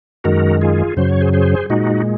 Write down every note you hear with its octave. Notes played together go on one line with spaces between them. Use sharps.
F#2 D#3 G#3 F#4 A#4
F4 G#4
F#2 C#3 F#3 C5
C#5
G#4 C5
G#4 C5
A#2 G#3 D#4 F#4